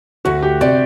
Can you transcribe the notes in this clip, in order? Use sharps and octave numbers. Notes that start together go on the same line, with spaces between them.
D2 F#4
G4
C3 D5